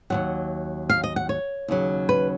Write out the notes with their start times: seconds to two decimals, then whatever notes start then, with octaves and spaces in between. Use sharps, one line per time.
0.10 D#2 D#3 F#3 F#5
0.89 F5
1.03 D#5
1.16 F#5
1.29 C#5
1.68 D#2 C#3 F#3
2.09 B4